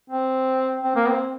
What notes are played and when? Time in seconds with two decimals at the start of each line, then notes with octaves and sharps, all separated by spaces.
0.10 C4
0.83 C4
0.96 A#3
1.08 C4